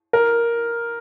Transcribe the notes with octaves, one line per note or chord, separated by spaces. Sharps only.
A#4